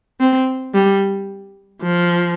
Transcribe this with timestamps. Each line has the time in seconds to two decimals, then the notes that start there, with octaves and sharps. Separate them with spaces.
0.20 C4
0.74 G3
1.82 F3